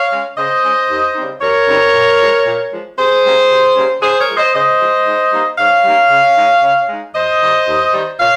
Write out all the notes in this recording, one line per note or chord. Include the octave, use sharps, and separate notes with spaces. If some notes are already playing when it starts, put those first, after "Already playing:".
Already playing: C#5 F5
G#3 C#4
C#3 C5 D#5
G#3 C#4
D#2
C#3 G3 C4 D#4
D#2 A#4 C#5
C#3 G3 C4 D#4
A#2
F3 G#3
A#2
F3 G#3
C3 G#4 C5
G3 A#3 C#4
C3
G3 A#3 C#4
C#3 G#4 C5
A#4 C#5
F3 G#3
C5 D#5
C#3 C5 D#5
F3 G#3
G#2
G3 A#3 D#4
G#2 C#5 F5
G3 A#3 D#4
C#3
G#3 D#4
C#3
G#3 D#4
D#2 C5 D#5
D#3 G3
D#2
D#3 G3
A#2 C#5 F5